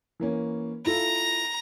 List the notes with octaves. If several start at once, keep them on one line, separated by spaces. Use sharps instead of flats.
E3 A#3 C#4
E4 F4 A4 A#5